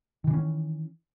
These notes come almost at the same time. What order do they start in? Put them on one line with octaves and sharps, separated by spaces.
D#3 E3 D4 C#4